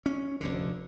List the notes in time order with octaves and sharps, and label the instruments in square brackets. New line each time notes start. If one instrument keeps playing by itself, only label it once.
[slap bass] C#4
F1 D2 D3